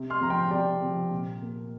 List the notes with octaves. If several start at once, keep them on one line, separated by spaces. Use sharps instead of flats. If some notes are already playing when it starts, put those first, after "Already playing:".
Already playing: C3
C6 F6
F3 C4 A#5
G5 C6
C3 D5 G5
F3 C4
A#2
A#3